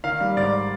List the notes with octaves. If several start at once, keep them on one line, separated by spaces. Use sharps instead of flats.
D#3 F5
G3
G#2 D5